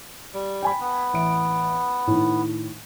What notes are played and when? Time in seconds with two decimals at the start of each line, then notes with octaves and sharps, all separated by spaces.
0.33 G3
0.62 G5 G#5 B5
0.80 B3
1.13 A1 E5 D7
2.07 A2 D#3